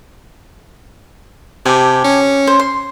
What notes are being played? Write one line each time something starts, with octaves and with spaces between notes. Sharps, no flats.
C3 G4 G#5 A5
C#4
C5
C6